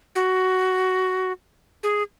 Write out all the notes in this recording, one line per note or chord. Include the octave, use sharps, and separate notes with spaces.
F#4
G#4